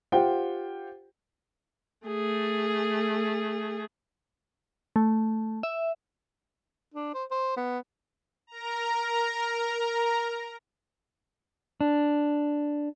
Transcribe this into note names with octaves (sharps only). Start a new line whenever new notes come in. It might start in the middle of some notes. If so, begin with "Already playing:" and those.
F4 G4 C5 F#5 G5
A3 G#4
A3
E5
D4
C5
C5
B3
A#4 A#5
D4